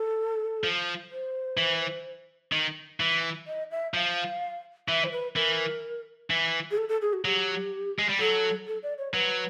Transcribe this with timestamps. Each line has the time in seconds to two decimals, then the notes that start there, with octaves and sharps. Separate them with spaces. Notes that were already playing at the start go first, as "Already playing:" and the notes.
Already playing: A4
0.64 F3
1.11 C5
1.57 E3
2.52 D#3
3.00 E3
3.47 D#5
3.71 E5
3.94 F3 F5
4.88 E3 E5
5.04 C5
5.12 B4
5.35 E3 A#4
6.30 E3
6.71 G#4
6.77 A4
6.89 A4
7.02 G#4
7.13 F#4
7.25 F#3 G4
7.99 G#3
8.09 G3
8.19 F#3 A4
8.67 A4
8.83 D5
8.98 C#5
9.13 F#3 B4